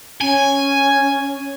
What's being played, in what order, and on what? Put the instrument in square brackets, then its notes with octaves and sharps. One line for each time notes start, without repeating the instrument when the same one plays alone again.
[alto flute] C#4 [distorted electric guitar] G#5